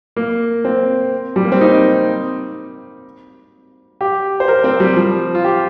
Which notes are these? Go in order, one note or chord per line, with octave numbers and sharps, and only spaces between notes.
A#3
C4
G3
A#3
C4
D#4
G4
C5
A#4
C4
G3
F3
F4
G4